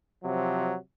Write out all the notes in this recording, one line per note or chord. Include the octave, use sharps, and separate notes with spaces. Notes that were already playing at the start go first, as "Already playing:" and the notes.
C3 F3 F#3